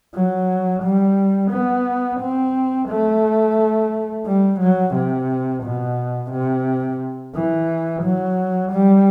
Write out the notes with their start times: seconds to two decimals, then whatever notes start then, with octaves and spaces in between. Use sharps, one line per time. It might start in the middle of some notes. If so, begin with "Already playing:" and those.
0.14 F#3
0.83 G3
1.51 B3
2.20 C4
2.89 A3
4.26 G3
4.60 F#3
4.95 C3
5.64 B2
6.32 C3
7.35 E3
8.04 F#3
8.72 G3